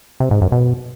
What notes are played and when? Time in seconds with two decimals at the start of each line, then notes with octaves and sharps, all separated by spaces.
0.20 C3
0.31 G#2
0.41 F#2
0.52 B2